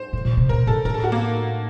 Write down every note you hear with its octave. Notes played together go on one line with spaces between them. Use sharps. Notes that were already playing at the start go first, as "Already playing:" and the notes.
Already playing: C5
A2
A#2
C3
A#2 A#4
A2 A4
A2 A#4
A4
F#4
A#3